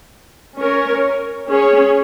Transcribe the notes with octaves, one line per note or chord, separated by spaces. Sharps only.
C#4 A#4 C#5
C#4 G#4 C#5